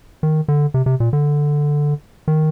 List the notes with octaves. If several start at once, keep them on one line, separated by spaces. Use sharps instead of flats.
D#3
D3
C3
C3
A#2
D3
D#3